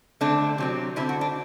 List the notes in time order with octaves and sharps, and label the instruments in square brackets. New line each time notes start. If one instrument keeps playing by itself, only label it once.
[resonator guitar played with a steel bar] D3 A3 C4 D4
C3 F#3 C4
D3 G3 E4
C4
F#4
D4